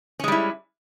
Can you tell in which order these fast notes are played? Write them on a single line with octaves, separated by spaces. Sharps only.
C#4 G#3 G3 E4